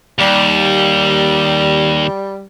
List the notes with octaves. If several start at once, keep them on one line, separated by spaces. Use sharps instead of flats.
D#2 G3